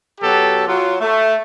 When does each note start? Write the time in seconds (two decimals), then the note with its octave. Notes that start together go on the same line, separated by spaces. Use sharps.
0.21 B2 F#3 G4 A4
0.67 F#3 F4
1.00 A3